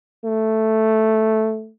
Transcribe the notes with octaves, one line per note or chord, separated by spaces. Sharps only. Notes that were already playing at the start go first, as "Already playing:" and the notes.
A3